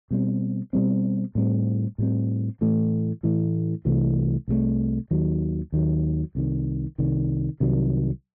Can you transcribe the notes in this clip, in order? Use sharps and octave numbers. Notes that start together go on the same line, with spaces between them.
B2 G3 C4
B2 G3 C4
A2 G3 C4
A2 G3 C4
A2 E3 A3
A2 E3 A3
C2 C3 E3 A3
C2 C3 E3 A3
D#2 D#3 F#3
D#2 D#3 F#3
C2 C3 D#3
C2 C3 D#3
C2 C3 D#3 F#3